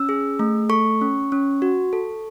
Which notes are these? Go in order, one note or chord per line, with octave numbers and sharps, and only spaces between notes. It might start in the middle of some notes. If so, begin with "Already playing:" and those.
Already playing: C#4 E6
G#4
A3
A4 C#6
C#4
C#4
F#4
A4